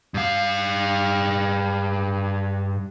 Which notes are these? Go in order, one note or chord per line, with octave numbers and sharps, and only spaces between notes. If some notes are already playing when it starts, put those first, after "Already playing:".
G2 F5